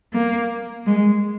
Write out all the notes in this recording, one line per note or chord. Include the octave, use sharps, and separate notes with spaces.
A#3
G#3